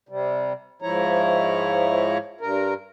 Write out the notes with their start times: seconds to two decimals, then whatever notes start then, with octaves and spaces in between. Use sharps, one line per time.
0.09 C3 G3
0.82 G#2 F3 E4 C#5 A#5
2.41 G2 A#4